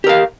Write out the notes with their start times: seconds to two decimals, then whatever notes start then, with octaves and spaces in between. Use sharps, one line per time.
0.04 G4
0.07 A#4
0.09 F5